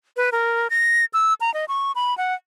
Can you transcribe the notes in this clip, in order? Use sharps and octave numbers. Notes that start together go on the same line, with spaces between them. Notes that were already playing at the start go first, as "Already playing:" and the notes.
B4
A#4
A#6
E6
A#5
D#5
C#6
B5
F#5